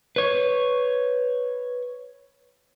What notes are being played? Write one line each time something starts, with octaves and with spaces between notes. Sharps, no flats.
B4 C#5